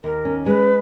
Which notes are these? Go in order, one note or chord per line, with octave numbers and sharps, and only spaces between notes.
D#2 A#4
C#4
G#3 B4